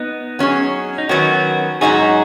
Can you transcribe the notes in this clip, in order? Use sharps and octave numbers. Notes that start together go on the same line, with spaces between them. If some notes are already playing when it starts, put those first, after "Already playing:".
Already playing: B3 D#4
F#3 C#4 G#4
D#4
D#3 F#3 B3 C#4 F#4
G#2 F#3 C#4 D#4 F#4 G#4